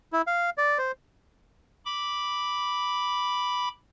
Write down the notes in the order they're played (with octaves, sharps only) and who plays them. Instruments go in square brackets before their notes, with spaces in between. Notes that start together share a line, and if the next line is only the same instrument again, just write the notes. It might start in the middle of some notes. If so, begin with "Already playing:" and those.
[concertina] E4
F5
D5
C5
[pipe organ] B5 D6